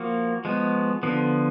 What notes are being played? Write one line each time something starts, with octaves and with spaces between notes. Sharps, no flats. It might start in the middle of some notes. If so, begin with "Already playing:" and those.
Already playing: F3 A#3 F#4
F3 G#3 B3
D3 F3 B3